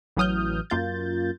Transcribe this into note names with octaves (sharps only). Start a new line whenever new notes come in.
A1 E3 F#3 D#6 F6 G6
F#2 A#3 F4 G6 A6